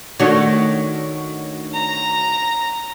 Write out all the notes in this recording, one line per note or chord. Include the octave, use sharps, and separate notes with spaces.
D#3 A3 D4 F#4 C#5
A#5